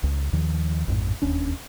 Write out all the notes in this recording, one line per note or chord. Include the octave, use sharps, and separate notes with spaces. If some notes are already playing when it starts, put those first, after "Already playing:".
C#2
D#2 D#3 F3
A1 F2 G#2
E1 D#2 C#4 D4